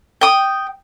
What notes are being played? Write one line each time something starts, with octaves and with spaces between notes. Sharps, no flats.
G5 D#6